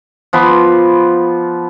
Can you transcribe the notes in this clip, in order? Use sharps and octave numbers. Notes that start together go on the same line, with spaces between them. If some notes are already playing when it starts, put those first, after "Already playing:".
F3 B3 B5 D6